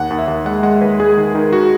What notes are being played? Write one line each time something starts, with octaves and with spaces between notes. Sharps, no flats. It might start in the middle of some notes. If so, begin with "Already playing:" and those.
Already playing: D#2 F#5
D#2
E5
D#2
G#3 F#5
G#3 F#5
D#2 B4
G#3 G#4
D#3
D#3
F#4